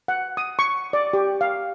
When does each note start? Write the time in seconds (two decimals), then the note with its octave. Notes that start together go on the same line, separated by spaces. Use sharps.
0.08 F#5
0.37 D#6
0.59 C#6
0.93 D5
1.13 G4
1.41 F5